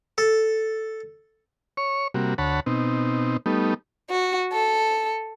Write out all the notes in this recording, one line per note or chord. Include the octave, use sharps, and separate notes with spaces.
A4
C#5 C#6
C3 G3 A#3 F#4
D2 C#5 F#5 A5 B5
B2 C4 D#4
G3 A3 B3 D#4
F#4
A4